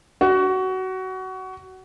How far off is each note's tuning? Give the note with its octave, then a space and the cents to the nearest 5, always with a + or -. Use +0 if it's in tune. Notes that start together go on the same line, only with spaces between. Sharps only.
F#4 +20